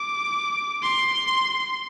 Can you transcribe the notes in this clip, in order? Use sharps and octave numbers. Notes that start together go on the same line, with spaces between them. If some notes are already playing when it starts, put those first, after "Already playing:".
Already playing: D6
C6